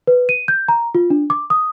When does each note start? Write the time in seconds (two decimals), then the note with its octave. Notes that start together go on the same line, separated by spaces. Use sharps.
0.07 B4
0.29 D#7
0.48 G6
0.68 A#5
0.95 F4
1.10 D4
1.30 D6
1.50 D#6